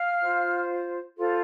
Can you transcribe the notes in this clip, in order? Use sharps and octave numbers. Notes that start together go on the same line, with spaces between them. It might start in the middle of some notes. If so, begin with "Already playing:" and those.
Already playing: F5 F6
F4 C5
F4 A4 C5